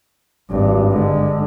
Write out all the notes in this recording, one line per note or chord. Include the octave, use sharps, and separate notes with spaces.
G#1 G2
D3 G#3